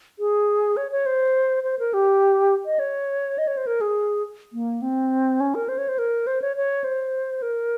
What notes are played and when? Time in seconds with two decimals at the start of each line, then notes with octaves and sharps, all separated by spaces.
0.19 G#4
0.77 C#5
0.92 C#5
1.06 C5
1.63 C5
1.79 A#4
1.94 G4
2.66 D#5
2.79 C#5
3.38 D#5
3.47 C#5
3.57 C5
3.67 A#4
3.81 G#4
4.53 A#3
4.82 C4
5.40 C#4
5.55 A#4
5.69 C5
5.78 C#5
5.88 C5
5.98 A#4
6.27 C5
6.42 C#5
6.56 C#5
6.84 C5
7.42 A#4